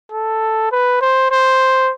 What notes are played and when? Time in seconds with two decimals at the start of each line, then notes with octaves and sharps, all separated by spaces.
0.12 A4
0.72 B4
1.02 C5
1.31 C5